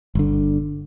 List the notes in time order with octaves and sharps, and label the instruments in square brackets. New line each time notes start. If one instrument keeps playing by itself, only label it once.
[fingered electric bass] G1 D3